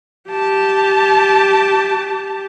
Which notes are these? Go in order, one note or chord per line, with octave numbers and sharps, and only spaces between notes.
G4 A5